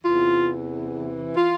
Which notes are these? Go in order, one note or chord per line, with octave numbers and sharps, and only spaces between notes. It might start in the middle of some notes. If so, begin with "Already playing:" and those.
E2 C3 E3 F4
E3 F4